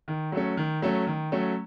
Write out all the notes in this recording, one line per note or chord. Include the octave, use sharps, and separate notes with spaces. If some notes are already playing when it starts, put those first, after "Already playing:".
D#3
F#3 A3 C#4
D#3
F#3 A3 C#4
D#3
F#3 A3 C#4